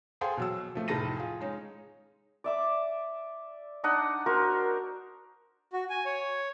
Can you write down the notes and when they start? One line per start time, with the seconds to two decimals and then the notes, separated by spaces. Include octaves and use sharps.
0.21 G#4 A4 C5 F5 G5 C6
0.37 B2 F#3 E6
0.75 F3 A3
0.88 F1 A2 A5 A#6 D#7
1.17 F4 G#4
1.41 G#3 C#4 D#4
2.44 D5 E5 D6
3.84 D4 D#4 D#5 F#5
4.26 F#4 A#4 C5
5.73 F#4
5.90 G#5
6.05 C#5